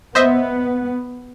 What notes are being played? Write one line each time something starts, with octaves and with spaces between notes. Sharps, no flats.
B3 C5 D#5 E5